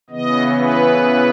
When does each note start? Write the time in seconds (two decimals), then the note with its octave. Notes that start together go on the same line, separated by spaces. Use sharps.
0.10 C#3 E3 B3 D#5
0.57 B4